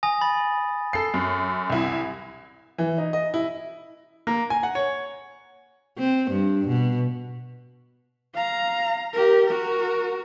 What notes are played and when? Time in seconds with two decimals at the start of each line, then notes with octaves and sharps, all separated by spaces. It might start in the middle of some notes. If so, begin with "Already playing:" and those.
0.03 G#5 D#6 A#6
0.21 B5 A6
0.93 A4 C7
1.14 F#2
1.70 C2 E4
2.78 E3
2.98 D#4
3.13 D#5
3.34 E4
4.27 A#3
4.50 G#5
4.63 F#5
4.75 C#5
5.98 C4
6.31 G2
6.68 B2
8.35 F5 A#5
9.13 G4 A#4
9.46 F#4 A#4